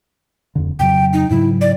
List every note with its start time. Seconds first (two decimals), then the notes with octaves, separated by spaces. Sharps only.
0.55 D1 F2 D3
0.79 F2 C#3 F#3 G5
1.13 D#4
1.30 G#2 C#3 F#3 E4
1.61 D5